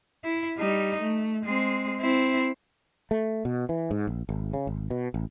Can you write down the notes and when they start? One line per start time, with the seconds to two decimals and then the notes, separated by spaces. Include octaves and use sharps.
0.24 E4
0.58 G3 D#4
1.01 A3
1.45 G#3 C4
2.00 C4 E4
3.11 A3
3.45 B2
3.69 E3
3.91 G#2
4.07 A#1
4.29 G#1
4.53 C#3
4.67 G#1
4.90 B2
5.14 A1